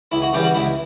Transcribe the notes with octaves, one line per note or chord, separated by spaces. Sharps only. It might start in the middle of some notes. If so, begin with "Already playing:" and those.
C#2 E4
F#4
C#3 E3 G3 G4
F#4
C#2 E4